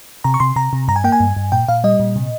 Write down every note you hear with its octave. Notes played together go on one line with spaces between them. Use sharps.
C3 A#5
C#6
C3 C6
C3 A#5
C3
G2 A#5
G#5
A#3 G5
G#5
G2
G2
A#2 G5
A#2 F5
G3 D#5
A#2
C3